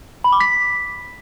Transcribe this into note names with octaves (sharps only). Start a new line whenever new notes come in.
B5
D6
B6